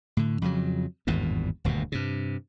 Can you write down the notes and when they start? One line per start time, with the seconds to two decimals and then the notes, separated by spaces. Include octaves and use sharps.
0.17 A2 D3
0.42 F2 C#3 F#3
1.07 G#1 E2 G2 A#2
1.64 D#1 D2 G2 B2
1.92 G2 C3